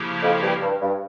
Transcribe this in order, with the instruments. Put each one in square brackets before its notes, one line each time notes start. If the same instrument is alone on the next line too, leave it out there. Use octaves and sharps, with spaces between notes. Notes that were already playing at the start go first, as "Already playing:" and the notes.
Already playing: [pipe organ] C#3 F3 A#3 E4 G4
[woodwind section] F2
G2
G2
G2